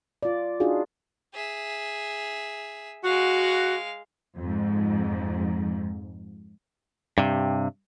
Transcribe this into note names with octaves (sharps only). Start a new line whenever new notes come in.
F4 D5
D4 D#4 F4 F#4 G#4
G#4 E5
G#3 F#4 F5
F2 G#2
G2 C3